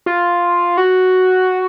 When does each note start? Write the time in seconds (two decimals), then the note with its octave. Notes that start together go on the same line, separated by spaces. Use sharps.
0.06 F4
0.77 F#4